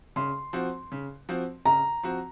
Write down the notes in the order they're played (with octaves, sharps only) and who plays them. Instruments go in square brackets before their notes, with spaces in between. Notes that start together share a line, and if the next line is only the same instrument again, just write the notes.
[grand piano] C#3 [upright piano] C6
[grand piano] F3 C4 F#4
C#3
F3 C4 F#4
[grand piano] C#3 [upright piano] A#5
[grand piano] F3 C4 F#4